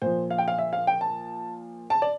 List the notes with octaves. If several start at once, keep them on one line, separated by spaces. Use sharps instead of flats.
A#2 F3 C5
F5
G5
F5
E5
F5
G5
A5
A5
D5